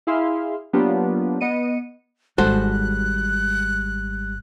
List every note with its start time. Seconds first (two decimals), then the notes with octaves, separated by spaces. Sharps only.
0.07 E4 G#4 E5 F5 C6
0.73 F#3 A#3 B3 D4 F4 G4
1.41 B3 D#5 C#7 D#7
2.38 G#1 G3 G#3 F#4 A4 C5 F#6